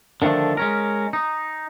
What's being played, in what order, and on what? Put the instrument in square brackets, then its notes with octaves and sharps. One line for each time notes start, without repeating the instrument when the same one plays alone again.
[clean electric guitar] D3 D#3 F3 A3 D4
G#3 C#4 A#4
D#4